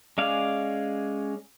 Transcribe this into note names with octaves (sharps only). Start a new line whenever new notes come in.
G#3 C#4 D5 F5